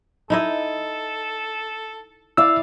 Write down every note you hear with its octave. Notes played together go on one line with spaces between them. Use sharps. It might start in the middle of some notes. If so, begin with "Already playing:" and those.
D#4 E4 A4 D#5
E4 D5 F5 E6